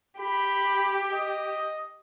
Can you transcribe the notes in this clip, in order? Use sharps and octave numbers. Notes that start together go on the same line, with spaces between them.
G4 B5
D#5